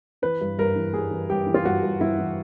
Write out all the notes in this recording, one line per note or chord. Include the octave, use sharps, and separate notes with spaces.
E3 B4
G2
G2 A#4
E3
G3 G#4
E3
G2 G4
E3
F4
G2 F#4
G2
G2 E4
E3